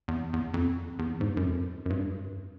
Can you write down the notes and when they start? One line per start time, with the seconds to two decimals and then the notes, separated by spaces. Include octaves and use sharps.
0.08 E2
0.33 E2
0.54 F2
0.99 E2
1.21 G#2
1.29 G2
1.37 F#2
1.45 F2
1.86 F#2
1.90 G2